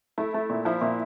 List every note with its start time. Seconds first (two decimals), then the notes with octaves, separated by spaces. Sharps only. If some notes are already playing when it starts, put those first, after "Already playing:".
0.18 A3 E4
0.34 A3
0.50 A#2
0.65 F3 E4
0.81 A#2